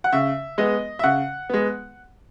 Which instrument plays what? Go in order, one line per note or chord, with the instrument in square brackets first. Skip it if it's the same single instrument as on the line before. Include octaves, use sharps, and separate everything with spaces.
[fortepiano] F#5
C#3 E5
G#3 B3 D#5
E5
C#3 F#5
G#3 B3